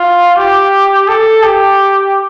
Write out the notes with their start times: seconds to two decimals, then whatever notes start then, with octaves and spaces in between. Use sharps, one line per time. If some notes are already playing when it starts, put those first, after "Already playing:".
Already playing: F4
0.36 G4
1.08 A4
1.43 G4